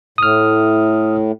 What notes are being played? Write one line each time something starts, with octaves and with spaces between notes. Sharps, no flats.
A2 D#6 F6